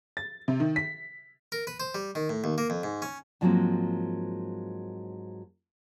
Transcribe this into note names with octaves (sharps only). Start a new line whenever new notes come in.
A6
C3
D#3
B6
A#4
B4
C5
G3
D#3
A2
D#2
A#3
F2
G#2
C#4
G#2 F3 F#3 G#3 A#3 C4